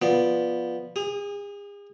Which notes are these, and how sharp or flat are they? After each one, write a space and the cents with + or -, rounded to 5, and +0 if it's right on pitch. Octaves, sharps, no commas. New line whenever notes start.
F3 +0 B3 -10 D5 +0
G#4 -40 D#6 +0